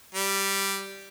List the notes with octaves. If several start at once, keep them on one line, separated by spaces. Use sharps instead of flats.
G3